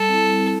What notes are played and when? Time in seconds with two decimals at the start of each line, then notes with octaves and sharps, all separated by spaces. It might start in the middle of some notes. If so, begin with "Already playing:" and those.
Already playing: G3 A4
0.08 C4 E4
0.23 G3
0.39 C4 E4